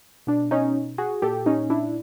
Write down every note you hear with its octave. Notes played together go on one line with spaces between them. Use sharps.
B2 D4
C#4 D#4
F#4 G#4
A#2 G4 A4
C#4 D#4
D4 E4